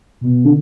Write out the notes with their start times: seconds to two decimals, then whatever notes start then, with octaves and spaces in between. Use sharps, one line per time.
0.21 B2
0.45 D3